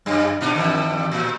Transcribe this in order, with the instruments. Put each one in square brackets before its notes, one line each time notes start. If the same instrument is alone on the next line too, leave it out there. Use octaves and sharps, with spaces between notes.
[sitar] F#2 G3
A#2 D4 D#4
E2 G2 D#3
A2